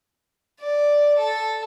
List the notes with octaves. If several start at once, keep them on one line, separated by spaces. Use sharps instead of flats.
D5
A4